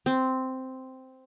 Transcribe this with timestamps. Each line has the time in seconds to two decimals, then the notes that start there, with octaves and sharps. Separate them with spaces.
0.06 C4